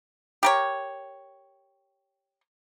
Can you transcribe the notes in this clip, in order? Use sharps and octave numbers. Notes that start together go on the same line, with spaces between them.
G4 A#4 C#5